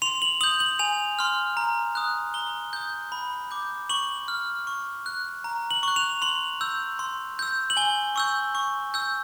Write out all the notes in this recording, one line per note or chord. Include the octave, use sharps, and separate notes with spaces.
C6 F7
F#7
D#6 G6 F#7
F#7
G#5 F7
C6 F6
A#5
D#6 F#6
A#5 G7
D#6 G6
B5
D6 G6
C#6 F#7
F6
C#6
F#6
A#5
F#7
C#6 F#6
F7
C6 F#7
E6 G6
C6
E6 G6
F#7
G#5 G7
C#6 E6 G6
C#6
E6 G6